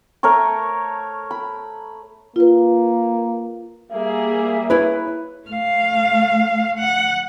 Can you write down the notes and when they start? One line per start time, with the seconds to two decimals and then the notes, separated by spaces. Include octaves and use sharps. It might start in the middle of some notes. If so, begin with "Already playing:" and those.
0.23 A3 A#4 C#5 C#6
1.31 B5
2.36 A#3 F4 B4
3.92 G3 A#3 G#4 E5
4.70 E4 B4 C#5
5.48 A3 F5
6.79 F#5